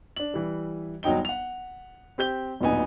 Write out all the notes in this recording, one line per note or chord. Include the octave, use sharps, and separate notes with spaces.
D4 F#7
E3 G3
G1 F#3 D#4 G5 G7
F#5 F7
C4 G4 G6 G7
D1 F2 A#2 B3 D#4 G#5